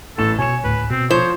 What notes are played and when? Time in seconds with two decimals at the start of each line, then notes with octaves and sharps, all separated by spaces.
0.18 A1 A2 A4 E7
0.39 B2 C#5 G#5 E7
0.64 D2 A2 B4
0.91 B2 C4
1.11 F3 C5 C#5